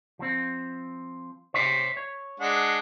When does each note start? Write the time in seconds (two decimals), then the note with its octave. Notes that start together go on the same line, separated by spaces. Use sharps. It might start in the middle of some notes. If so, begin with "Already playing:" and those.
0.19 F3 C4
1.54 C5 C#5 E5
1.97 C#5
2.40 G#3 D4 F#5